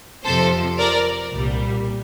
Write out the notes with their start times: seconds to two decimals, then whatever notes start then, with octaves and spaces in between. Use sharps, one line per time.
0.24 F2 C3 F3 A4 C5
0.79 A#4 D5
1.33 C2 A#2 G3